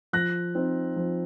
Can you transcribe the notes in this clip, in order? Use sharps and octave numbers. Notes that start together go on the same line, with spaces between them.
F3 F#6 A#6
C4 D#4
F3